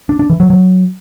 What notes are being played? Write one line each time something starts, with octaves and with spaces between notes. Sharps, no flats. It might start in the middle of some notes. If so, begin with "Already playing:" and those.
D4
D4
E3
F#3
F#3